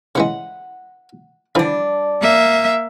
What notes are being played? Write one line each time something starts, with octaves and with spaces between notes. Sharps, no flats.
C#3 E3 G#3 F#5
D3 E3 F3 G3 D4
A#3 E5